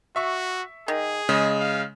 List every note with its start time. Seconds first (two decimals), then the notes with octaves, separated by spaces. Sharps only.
0.16 F#4 E5 C#6
0.88 D#3 G#4
1.29 C#3 G#3 D#5
1.60 F5